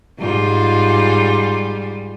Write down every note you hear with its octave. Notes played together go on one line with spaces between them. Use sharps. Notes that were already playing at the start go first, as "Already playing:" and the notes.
G#2 G3 F4